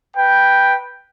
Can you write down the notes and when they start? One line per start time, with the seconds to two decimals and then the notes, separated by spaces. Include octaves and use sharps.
0.17 B4 G5